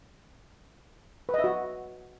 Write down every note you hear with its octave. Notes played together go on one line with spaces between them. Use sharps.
B4
D#5
E5
F#4